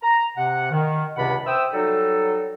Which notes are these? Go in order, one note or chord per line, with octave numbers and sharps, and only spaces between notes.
A#5
C3 F#5
D#3
C#2 G2 C3 D4 F#5 B5
C5 E5 G5 D#6 E6
F#3 G3 D#4 A4